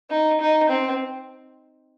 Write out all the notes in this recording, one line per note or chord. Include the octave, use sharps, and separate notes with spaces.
D#4
D#4
C4